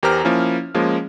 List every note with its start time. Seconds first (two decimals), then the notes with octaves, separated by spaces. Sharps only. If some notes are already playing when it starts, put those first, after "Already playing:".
0.03 E2 G4 A#4 C5 A#5 F6
0.24 F3 A#3 C#4 E4
0.74 F3 G#3 A#3 C#4